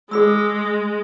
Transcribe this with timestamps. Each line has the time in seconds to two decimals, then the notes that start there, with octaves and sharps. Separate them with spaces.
0.11 G#3 G#4 B5 E6